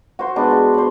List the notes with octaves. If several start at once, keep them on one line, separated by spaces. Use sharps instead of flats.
F#4 C5
G#3 B3 D4
F#4
C5 D5